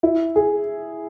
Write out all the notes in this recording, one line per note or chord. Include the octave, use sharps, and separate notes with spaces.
E4
G#4